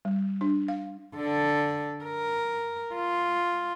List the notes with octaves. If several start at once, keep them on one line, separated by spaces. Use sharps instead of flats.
G3
D4
F5
D3 A4
A#4
F4